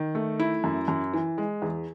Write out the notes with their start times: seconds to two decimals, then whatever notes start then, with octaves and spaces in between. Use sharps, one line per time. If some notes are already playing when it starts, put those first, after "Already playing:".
Already playing: D#3
0.15 A3
0.40 E4
0.64 F#2
0.88 F#2
1.13 E3
1.38 G#3
1.62 E2